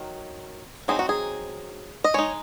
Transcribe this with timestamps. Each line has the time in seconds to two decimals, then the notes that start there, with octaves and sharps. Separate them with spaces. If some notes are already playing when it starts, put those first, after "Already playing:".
Already playing: D#3 F#3
0.88 F#3 C4 D#4 G#4
0.99 F#4
1.09 G#4
2.04 D#5
2.14 G#3 D#4 C#5